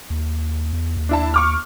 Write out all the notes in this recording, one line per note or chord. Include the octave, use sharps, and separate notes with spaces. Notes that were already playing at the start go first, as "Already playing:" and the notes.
D#2
E2
D#2
D4 E4 A5
C#6 D6 F6